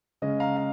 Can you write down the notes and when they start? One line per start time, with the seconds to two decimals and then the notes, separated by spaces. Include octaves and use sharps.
0.22 C#3 G#3 C#4 D#5
0.40 F5 A#5
0.57 F5